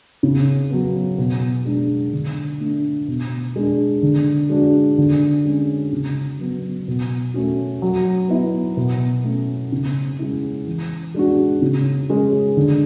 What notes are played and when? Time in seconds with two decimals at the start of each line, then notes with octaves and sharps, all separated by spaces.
0.23 C#3
0.70 F#3 B3
1.18 B2
1.65 G#3 D4
2.13 D3
2.60 A3 D4
3.08 B2
3.56 G#3 D4
4.03 D3
4.50 G#3 D4 F#4
4.98 D3
5.45 G#3 C#4
5.92 C#3
6.39 F#3 B3
6.88 B2
7.34 A3 C#4 F#4
7.82 F#3
8.29 B3 E4
8.77 B2
9.24 A3 C#4
9.72 C#3
10.19 G#3 C#4 E4
10.67 E3
11.14 G#3 D4 F#4
11.62 C#3
12.09 G#3 C#4
12.57 D3